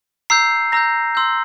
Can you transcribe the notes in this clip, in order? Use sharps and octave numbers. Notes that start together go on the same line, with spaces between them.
A#5 E6 G6 C7
A#5 E6 G6 A#6
C6 E6 G6